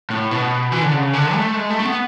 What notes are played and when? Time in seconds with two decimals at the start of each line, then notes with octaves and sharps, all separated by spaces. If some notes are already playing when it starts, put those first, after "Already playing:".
0.10 A2
0.31 B2
0.72 E3
0.82 D3
0.93 C#3
1.13 D3
1.34 A3
1.55 G#3
1.70 A3
1.80 A3
1.85 B3